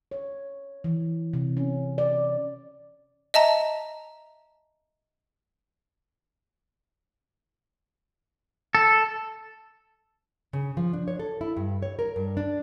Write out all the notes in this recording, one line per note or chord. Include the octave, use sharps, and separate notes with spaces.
C#5
E3
C3
C#4
D5
D#5 E5 A5 A#5
A4
C#3
F3
D4
C#5
A4
E4
G2
C#5
A#4
G2
D4